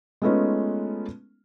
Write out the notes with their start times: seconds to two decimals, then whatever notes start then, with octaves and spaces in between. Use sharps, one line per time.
0.22 G#3 A3 B3 C#4 D#4 F4